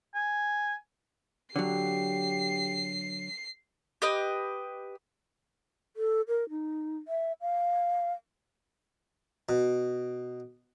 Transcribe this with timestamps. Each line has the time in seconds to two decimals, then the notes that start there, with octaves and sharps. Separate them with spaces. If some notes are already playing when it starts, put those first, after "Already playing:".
0.15 G#5
1.56 D3 F#3 G4 C7
4.02 G4 B4 D#5
5.97 A4
6.28 A#4
6.50 D#4
7.08 E5
7.41 F5
9.49 B2